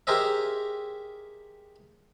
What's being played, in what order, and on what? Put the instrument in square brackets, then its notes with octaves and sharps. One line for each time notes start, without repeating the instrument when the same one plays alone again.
[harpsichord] G4 G#4 A#4 C5 D#5 E5